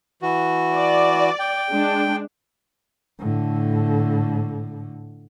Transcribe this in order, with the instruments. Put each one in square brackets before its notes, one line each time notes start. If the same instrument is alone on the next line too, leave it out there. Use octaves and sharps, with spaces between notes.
[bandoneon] E3 F#4
[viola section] D5
[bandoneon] G5
[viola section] G#3 D4
[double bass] A2 D3